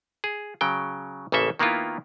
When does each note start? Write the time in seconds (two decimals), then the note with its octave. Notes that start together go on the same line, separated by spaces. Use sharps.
0.24 G#4
0.61 C#3 F#3 G5
1.32 A1 C#3 A#3 A4 E5
1.59 D#3 A#3 B3 E4 F4